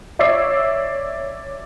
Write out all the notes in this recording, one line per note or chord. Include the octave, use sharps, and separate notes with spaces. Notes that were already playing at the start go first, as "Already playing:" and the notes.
C#5 D5 E5 E6 C7